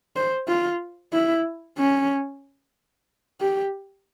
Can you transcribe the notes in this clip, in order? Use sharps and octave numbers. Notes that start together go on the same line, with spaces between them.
C5
F4
E4
C#4
G4